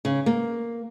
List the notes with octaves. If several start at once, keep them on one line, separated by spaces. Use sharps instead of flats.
C#3
A#3